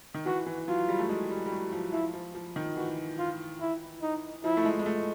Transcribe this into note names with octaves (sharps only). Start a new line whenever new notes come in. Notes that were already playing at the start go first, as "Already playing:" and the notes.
D#3
E3 F#4
E3
F#3 F4
G3
A3
G#3
G3
G3
F#3
F3
F3 E4
F3
F3
D#3
E3 F#4
F4
E4
D#4
F3 E4
A3
G#3
G#3
A3